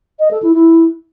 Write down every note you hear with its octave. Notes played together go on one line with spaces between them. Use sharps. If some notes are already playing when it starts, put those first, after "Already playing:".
D#5
A4
E4
E4